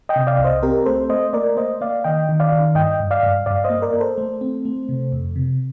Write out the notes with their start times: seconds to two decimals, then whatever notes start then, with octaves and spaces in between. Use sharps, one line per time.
0.09 D#5 G5
0.16 C3
0.27 D5 F5
0.38 C2
0.44 C5 D#5
0.63 C4 G4 A#4
0.86 A3 A4 C5
1.09 A3 C5 D#5
1.33 A#3 A#4 D5
1.57 A#3 C5 D#5
1.81 A#3 D5 F5
2.04 D#3 D#5 G5
2.29 D#3
2.40 D5 F5
2.52 D#3
2.75 G2 D#5 G5
3.00 G2
3.11 D5 F5
3.23 G2
3.46 G2 D5 F5
3.64 C5 D#5
3.70 A#3
3.82 A#4 D5
3.93 A#3
4.00 A4 C5
4.18 A3
4.41 C4
4.65 A3
4.89 C3
5.12 F2
5.36 C3